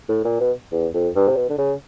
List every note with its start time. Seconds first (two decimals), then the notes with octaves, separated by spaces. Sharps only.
0.09 A2
0.25 A#2
0.40 B2
0.72 E2
0.94 F2
1.15 G2
1.29 C3
1.36 B2
1.49 D3
1.58 C#3